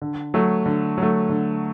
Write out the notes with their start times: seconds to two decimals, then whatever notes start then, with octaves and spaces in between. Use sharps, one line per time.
0.02 D3
0.34 F#3 A3
0.66 D3
0.98 F#3 A3
1.29 D3